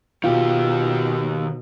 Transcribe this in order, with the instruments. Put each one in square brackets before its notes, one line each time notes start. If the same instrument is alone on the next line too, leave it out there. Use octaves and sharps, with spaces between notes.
[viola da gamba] B2 [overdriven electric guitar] D#3 G4 [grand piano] F4